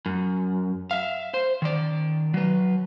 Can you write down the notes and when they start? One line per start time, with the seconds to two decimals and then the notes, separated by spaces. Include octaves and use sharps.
0.06 F#2
0.91 E5 F5
1.34 C5
1.62 D#3 D5
2.34 F#3 B4